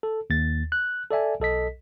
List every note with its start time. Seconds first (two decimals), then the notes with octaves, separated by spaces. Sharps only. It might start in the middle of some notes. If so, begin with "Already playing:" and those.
0.03 A4
0.30 D#2 A6
0.72 F#6
1.10 A4 D5 E5 G#5
1.40 B1 A4 D#5 B6